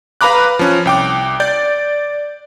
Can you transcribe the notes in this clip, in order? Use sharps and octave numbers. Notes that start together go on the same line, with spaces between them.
B4 F5 A#5 B5 D6 F#6
F3 C#4
C2 G5 D6
D5 G6